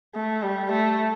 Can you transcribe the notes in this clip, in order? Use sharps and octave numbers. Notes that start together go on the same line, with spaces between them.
A3
G3
A3